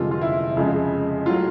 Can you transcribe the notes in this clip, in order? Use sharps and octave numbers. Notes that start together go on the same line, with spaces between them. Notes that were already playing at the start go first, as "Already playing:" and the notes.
Already playing: G1 F2 C3 D#3 G#3 F4
F4
E4
F2 C#3 F3 G#3
A2 F#3 F4